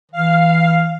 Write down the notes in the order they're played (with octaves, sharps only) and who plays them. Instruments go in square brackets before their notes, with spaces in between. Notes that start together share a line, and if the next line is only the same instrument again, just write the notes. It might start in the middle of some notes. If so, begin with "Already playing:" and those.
[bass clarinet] E3 [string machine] F5